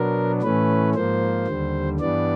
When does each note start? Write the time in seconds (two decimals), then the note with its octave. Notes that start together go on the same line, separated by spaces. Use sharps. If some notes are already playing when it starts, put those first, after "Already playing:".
Already playing: B2 F#3 B3 D4 A#4
0.42 A2 E3 A3 C#4 B4
0.95 G#2 F3 A#3 C5
1.47 D#2 D3 G3
2.00 G2 E3 G3 B3 D4 D5